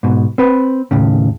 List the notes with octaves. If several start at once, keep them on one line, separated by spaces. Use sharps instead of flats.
G#2 B2
C4 B4
D#2 A2 C#3